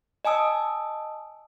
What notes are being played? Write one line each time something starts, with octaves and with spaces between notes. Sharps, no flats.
D#5 G#5 A5 D#6 E6